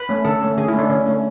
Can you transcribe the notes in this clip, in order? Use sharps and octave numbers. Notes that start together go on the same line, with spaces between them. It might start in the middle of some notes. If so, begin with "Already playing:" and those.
Already playing: B4
A3 C#4
D3 A4
A3 C#4
D3 G#4
E4
A3 C#4 D4
D3 C#4
A3 C#4